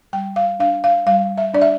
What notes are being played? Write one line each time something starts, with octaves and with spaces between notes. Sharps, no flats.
G3 G5
F5
D4 F5
F5
G3 F5
E5
D4 D5
E5